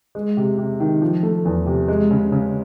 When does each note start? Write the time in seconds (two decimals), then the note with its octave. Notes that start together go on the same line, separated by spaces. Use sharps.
0.15 G#3
0.37 C3
0.58 C3
0.80 D#3
1.02 F3
1.23 A3
1.45 E2
1.66 C3
1.88 G#3
2.11 C#3
2.32 C#3